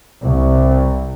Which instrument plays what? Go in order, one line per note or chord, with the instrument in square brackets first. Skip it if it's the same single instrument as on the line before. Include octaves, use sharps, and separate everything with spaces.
[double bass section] C2